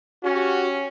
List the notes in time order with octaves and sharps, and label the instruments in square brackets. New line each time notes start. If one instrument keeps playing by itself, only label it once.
[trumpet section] C#4 [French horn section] F#4 G4